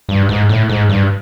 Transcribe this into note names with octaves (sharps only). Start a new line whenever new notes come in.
G2
G#2
A2
G#2
G2